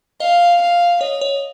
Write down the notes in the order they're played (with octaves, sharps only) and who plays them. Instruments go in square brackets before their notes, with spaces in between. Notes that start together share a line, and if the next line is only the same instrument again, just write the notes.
[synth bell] D#5 [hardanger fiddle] F5
[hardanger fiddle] F5
[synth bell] C#5 [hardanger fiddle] D#5
[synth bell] C#5